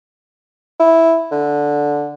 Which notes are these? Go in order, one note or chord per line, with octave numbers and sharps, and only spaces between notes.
E4
D3